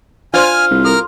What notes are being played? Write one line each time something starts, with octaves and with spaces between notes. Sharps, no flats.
D4 F4 C5 D5 G#5 F6
C2
A4 A#4 F6